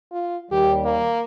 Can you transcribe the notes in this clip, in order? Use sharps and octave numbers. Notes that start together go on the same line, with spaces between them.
F4
D#2 G3 G4
A#3